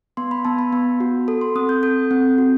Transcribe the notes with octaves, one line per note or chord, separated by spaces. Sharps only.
B3 C6
B5
B3 A5
B5
B3
F#4
A4
C6
C4 D#6
G6
A4 G6
C4
F#4